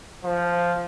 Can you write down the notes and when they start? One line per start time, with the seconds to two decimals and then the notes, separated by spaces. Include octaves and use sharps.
0.24 F3